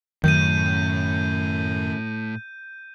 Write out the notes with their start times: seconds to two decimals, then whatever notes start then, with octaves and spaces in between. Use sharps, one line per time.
0.24 F#2 A2 D#3 G6 D#7